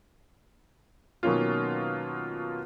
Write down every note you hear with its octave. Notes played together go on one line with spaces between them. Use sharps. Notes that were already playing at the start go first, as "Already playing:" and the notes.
B2 D#3 F#3 A#3 C#4 F4